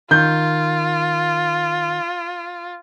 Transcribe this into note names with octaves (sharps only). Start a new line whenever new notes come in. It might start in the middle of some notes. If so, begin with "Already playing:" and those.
D#3 F4 G6